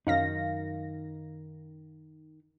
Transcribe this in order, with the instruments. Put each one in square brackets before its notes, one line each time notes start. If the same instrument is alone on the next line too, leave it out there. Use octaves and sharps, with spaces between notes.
[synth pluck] F#2 F5 A#6 [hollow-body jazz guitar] D#3 D#4